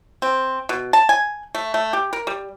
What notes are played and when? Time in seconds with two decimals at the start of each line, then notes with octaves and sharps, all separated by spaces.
0.22 C4
0.69 B2
0.93 A5
1.09 G#5
1.55 A3
1.74 A3
1.93 G4
2.13 A#4
2.27 G3